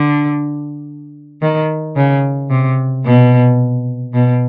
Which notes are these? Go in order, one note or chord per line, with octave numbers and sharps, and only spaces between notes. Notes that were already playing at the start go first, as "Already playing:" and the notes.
Already playing: D3
D#3
C#3
C3
B2
B2